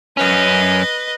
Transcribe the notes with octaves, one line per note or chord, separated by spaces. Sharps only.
F#2 C#4 B4 D#5